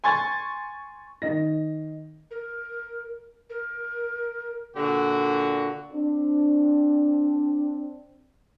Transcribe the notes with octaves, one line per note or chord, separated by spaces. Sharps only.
G#5 C6 C#6 G#6 A6
D#3 D#5 A#6
A#4
A#4
A#2 D3 F#4
C4 D4